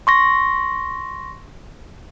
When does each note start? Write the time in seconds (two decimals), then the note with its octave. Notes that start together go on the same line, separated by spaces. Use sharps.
0.07 C6 C#6 A#6